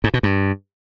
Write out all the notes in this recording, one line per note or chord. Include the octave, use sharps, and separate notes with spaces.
G#2
B2
G2